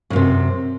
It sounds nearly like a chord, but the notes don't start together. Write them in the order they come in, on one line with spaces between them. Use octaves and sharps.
A2 F#2 C3